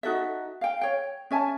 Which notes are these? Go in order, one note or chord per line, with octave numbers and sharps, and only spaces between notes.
D#4 F#4 A4 E5
F5 G5
C#5 G5
C#4 E5 G#5 A5